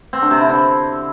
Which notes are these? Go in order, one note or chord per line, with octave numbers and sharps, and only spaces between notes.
C4
D3
C3
E4
D3